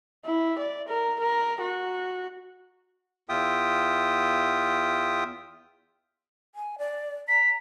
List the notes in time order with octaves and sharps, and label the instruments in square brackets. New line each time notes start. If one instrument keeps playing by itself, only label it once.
[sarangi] E4
D5
A#4
A#4
F#4
[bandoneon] E2 F4 E5 G5 D#6
[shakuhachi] G#5
D5
[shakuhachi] A#5 [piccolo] B6